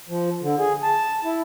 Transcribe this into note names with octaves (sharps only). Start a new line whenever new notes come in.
F3
D3
G#4
A5
E4